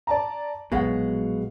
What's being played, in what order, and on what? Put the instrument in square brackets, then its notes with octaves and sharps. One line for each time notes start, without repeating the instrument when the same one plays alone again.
[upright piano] D5 A5 A#5
[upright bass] A#1 [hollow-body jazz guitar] B2 F#3 G#3 [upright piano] F5 F#5